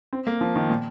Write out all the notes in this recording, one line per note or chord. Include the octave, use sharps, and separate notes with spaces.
C4
A#3
F3
D#3
A#2